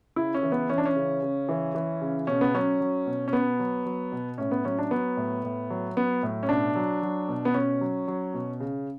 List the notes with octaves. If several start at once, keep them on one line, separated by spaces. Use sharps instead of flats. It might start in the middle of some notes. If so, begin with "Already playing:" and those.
C#3 E4
C#4
E3
B3
E3 C#4
D4
C#4
C#3
C#3
E3
E3
C#3
B2 C#4
B3
F#3 C#4
F#3
B2
C#4
B2 B3
F#3
F#3
B2
A2 C#4
B3
F#3 C#4
D4
F#3 B3
A2
A2
F#3
F#3 B3
A2
C#4
B2 D4
F#3
F#3
B2
B3
B2 C#4
F#3
F#3
B2
C#3